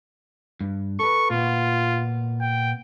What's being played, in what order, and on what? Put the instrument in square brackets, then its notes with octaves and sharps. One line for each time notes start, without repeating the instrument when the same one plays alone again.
[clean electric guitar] G2
[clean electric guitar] A4 B4 [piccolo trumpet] C#6
[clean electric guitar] A#2 B3 [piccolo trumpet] F4
[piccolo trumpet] G5